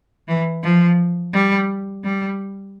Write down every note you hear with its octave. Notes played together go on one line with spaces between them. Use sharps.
E3
F3
G3
G3